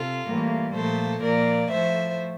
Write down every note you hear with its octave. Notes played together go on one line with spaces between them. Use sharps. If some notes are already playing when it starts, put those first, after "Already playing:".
Already playing: C3 F4 A4
A2 E3 G3 A#3
A#2 F3 A3 A4 C5
A#2 F3 A#3 A#4 D5
A2 F3 A3 C5 E5